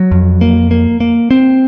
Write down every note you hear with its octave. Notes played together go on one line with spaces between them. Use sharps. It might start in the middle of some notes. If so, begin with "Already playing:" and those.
Already playing: F#3
F2
A#3
A#3
A#3
C4